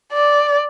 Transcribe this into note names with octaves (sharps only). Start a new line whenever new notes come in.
D5